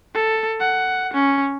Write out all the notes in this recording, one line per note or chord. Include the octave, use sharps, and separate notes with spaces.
A4
F#5
C#4